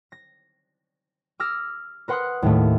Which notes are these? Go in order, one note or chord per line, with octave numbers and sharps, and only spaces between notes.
A#6
D6 E6 F6 A#6
A#4 B4 F#5 C6 D#6 F#6
D#2 A2 A3